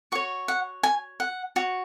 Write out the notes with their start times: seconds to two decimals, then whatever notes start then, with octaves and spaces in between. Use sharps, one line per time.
0.12 F#4 C#5 C#6
0.48 F#5
0.83 G#5
1.20 F#5
1.56 F#4 C#5